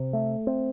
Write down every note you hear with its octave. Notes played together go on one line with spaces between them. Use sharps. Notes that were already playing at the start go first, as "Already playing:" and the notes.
Already playing: C3
A3
C4